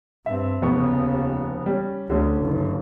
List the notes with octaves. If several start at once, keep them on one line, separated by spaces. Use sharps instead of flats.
G2 C4 E5
F1 D#2 C#3 B3 C#6
G3 C#4
D2 D3 F#3 C#4
F#1 G2